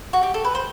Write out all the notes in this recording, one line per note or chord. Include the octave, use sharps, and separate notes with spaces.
F#4
G4
A4
B4
C5